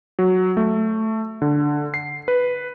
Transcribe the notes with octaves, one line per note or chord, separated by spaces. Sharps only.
F#3
A3
D3
C7
B4